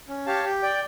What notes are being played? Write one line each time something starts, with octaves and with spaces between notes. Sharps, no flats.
C#4
G4 C#5 F5 A5
G4
D5 G5